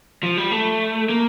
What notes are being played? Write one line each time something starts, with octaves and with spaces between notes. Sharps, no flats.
F3
G3
A3
A#3